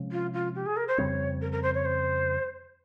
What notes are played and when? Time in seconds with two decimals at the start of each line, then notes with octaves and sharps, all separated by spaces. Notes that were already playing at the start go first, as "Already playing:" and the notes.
Already playing: C3 F3 G#3 C#4
0.12 F4
0.33 F4
0.55 G4
0.66 G#4
0.77 A#4
0.88 C5
0.98 F2 C#3 G3 C4 C#5
1.42 A#4
1.52 A#4
1.63 C5
1.74 C#5
1.85 C5